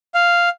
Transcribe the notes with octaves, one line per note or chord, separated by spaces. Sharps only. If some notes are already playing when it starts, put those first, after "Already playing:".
F5